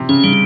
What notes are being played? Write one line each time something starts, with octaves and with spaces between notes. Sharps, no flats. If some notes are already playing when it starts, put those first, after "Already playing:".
Already playing: C3
C#3 C#4
C#3 G3